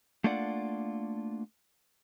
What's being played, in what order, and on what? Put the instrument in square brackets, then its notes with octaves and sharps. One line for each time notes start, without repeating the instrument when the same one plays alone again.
[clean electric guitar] A3 A#3 D4 F4 D5 F#5